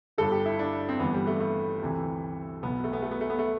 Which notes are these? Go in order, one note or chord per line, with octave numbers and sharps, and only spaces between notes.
G1 G2 D3 A4
G4
E4
D4
C4
G1 G2 E3 B3
G3
A3
A3
D2 C3 E3
B1 B2 B3
A3
B3
A3
B3
A3
B3
A3